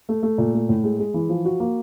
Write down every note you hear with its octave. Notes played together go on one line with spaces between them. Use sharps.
A3
A3
A#2
A3
A2
G#3
G#3
E3
F3
F#4
A#3